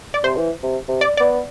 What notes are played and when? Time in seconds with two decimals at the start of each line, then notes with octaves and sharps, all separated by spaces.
0.14 D5
0.24 C3 C5
0.37 E3
0.63 C3
0.88 C3
1.01 D5
1.17 B3 D5